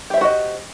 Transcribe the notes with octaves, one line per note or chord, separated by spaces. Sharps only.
F#4 G4 C5 D#5 E5